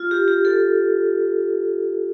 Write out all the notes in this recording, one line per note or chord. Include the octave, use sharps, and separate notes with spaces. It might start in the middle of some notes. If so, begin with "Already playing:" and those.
Already playing: F4
G4
G4
A4